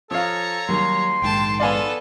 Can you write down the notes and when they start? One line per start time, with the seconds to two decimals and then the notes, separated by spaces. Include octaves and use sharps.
0.11 F3 A4 C#5 F5 A#5
0.69 D#2 F#3 G3 C6
1.22 A#1 G#2 D#3 G5 A5
1.60 B3 A4 D5 F5 G#5